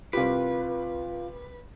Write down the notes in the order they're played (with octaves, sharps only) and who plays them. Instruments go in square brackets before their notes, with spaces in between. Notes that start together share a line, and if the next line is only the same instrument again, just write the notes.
[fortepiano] C2 G4 [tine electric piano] F4 F5 [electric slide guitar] B4